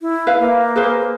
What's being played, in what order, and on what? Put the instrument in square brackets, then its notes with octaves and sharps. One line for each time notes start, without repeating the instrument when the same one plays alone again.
[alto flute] E4
[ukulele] B4 E5 F5
[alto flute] A#3
[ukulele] G#4 B4 C5